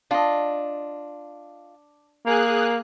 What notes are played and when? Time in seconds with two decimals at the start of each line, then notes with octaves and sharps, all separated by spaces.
0.11 D4 F4 D#5
2.26 A#3 G#4 F#6